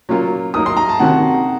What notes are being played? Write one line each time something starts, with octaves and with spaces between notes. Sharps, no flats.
F#3 A#3 C#4 F4
F#3 A#3 D#4 A#4 D#6
C6
A#5
A5
C3 D#3 A#3 C#4 F#4 F#5